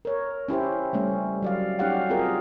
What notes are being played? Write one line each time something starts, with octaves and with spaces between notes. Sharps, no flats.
A#4 C#5
C#4 E4 G4 C5
G3 A3 C#4
F#3 D5 F5
C#4 D#4 F#4 G4 F5 F#5
C4 F4 G#4 A#4